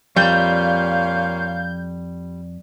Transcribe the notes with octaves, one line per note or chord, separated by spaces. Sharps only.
F2 A#2 G3 C#5 F5 G6